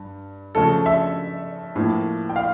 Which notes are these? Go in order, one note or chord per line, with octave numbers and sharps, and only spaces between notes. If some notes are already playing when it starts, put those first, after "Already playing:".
Already playing: G2
C#3 F3 A3 A4
E5
A2 F3 A#3
G5
F5